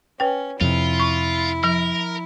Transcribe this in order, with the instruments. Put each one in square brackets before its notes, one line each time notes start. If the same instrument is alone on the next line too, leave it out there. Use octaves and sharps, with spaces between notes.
[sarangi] C#4 [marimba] B4 G5
[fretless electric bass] F2 C3 [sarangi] E4 [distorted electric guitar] F4
[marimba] C#6
[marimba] F3 [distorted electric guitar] A#4